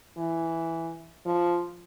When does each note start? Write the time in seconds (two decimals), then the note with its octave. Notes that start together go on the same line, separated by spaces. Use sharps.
0.17 E3
1.26 F3